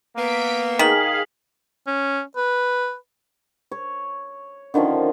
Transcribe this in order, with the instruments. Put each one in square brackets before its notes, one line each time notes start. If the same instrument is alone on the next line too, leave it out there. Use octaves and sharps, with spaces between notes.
[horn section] A#3 B3 [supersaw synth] B6 D7
[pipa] D#3 [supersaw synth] G#4 F5 [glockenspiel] B6 F#7
[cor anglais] C#4
B4
[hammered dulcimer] C#5
D3 D#3 F3 C#4